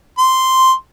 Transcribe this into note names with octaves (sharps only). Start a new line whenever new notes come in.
C6